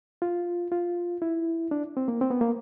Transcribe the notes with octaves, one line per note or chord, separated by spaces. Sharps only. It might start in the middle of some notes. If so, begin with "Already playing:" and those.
F4
F4
E4
D4
C4
A#3
C4
B3
A#3